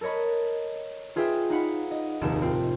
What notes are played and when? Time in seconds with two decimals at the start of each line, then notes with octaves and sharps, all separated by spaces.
0.01 A4 A#4 C#5 D#5 B5
1.16 F4 G#4 B4 E5 G5
1.50 D#4 F5 F#5 B5
1.91 D#5
2.21 F1 A#1 D#2 C3 E7
2.42 A2 C4 F4